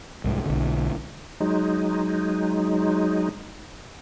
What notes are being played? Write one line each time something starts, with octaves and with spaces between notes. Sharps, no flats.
C2 G#2
B1 D3
F#3 G#3 D#4